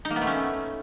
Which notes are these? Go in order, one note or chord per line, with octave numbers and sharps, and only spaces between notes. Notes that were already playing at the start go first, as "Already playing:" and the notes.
D#4
A#3
B3
A3
C#4